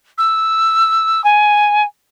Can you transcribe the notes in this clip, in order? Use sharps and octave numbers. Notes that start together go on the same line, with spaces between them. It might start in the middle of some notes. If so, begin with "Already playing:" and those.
E6
G#5